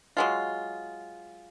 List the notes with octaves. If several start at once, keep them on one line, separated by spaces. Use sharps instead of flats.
F#3 G#3 F4